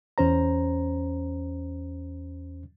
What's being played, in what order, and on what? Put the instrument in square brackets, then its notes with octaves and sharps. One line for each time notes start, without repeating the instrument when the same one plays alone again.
[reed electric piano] E2 C#4 C5 A#5